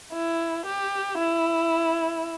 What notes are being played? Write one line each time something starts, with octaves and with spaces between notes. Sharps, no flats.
E4
G4
E4